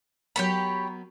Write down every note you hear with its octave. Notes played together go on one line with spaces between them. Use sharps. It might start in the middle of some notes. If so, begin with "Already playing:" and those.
F#3 B3 G4 A#4 C#5 B5